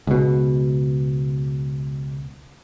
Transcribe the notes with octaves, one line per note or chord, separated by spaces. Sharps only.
C#2 B2